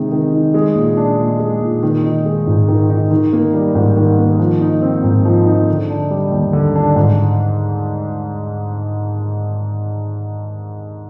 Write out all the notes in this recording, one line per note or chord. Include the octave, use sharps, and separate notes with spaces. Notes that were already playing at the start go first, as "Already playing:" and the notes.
Already playing: C3 D#3 G#3 D#4
D#3
D#4
G#3
A#2
D4
A#2
G#3
A#2
D#3
D#4
G#3
G#2
D#3
D#4
D#3
A#3
G3
G#2
D#3
A#3
F3
D#4
C4
G#2
F3
D#4
D3
D4
G3
D#2
D3
D4
G#2